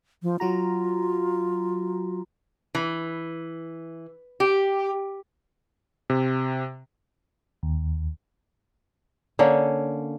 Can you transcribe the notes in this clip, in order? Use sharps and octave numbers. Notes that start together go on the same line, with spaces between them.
F3
F#3 F4 F#4 A#5
E3
G4
C3
D#2
D3 A#3 C#4 C#5